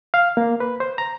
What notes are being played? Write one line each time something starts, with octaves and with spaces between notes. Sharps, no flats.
F5
A#3
B4
C5
A#5